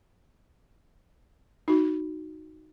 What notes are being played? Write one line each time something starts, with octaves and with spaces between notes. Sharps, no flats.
D#4 F#4